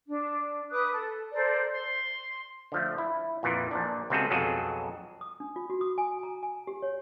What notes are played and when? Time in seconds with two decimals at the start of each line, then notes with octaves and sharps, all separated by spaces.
0.08 D4
0.71 B4 D6 D#6 F#6
0.92 A4
1.32 A4 A#4 C5 D5
1.72 C6
2.72 D3 F3 A3
2.98 E4
3.43 F2 A#2 E3
3.71 A#1 A#2 D4
4.10 C#2 C3 F#3 C4 G#4 A4
4.30 B1 F2 F#3 G#4 A4
5.21 D#6
5.40 D4
5.56 F4
5.70 F#4
5.81 D#6
5.98 G#5
6.23 A#5
6.43 G#5
6.67 G4
6.82 C#5